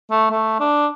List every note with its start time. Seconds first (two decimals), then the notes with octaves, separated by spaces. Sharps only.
0.11 A3
0.30 A3
0.60 D4